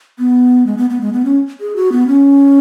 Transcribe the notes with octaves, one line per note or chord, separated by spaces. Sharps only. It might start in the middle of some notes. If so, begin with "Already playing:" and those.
B3
G#3
B3
B3
G#3
B3
C#4
G#4
F#4
B3
C#4